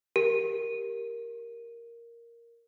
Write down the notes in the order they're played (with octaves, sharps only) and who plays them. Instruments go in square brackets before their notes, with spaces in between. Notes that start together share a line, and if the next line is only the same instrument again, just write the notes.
[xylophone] G4 [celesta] A#4